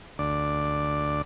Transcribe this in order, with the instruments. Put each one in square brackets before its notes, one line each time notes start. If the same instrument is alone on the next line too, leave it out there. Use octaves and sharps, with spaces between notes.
[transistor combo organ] D2 D5